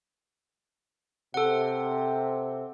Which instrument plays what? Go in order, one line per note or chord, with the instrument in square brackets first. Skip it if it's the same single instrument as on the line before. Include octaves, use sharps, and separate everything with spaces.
[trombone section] C3 [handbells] A4 F#5